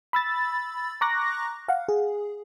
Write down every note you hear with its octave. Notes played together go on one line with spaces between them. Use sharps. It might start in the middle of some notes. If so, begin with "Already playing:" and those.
B5 E6 A6
A#5 C#6 D6 F#6 A#6
F5 F#5
G#4